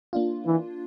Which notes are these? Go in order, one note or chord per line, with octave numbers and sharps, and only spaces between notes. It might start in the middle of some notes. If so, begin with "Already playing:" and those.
A#3 D4 F4
E3